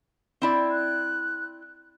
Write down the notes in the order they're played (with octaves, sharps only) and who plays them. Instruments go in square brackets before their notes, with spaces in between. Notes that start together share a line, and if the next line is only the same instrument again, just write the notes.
[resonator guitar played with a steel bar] C4 E4 D5
[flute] F#6